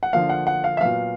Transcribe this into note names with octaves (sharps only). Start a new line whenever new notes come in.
F#5
D3 F3 A#3 F5
F#5
F#5
F5
E5
A#2 F#3 B3 F5